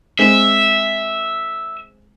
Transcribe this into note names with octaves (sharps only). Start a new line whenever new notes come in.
G#3 C4 E5